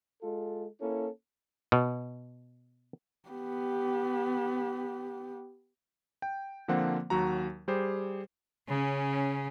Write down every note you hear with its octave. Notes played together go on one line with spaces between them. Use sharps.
G#3 F4 A4
A#3 C#4 E4 A4
B2
B3 G4
G5
D3 F3 A#3 C4 F#5
D#2 F#3 F#4 A#5
G3 G4 G#4 C5
C#3 C#4